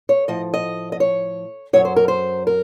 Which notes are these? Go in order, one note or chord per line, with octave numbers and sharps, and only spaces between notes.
C#5
A2 F3 D#5
D#5
D#5
C#5
F#2 D#3 F#3 C#5
C5
A#4
C5
A#4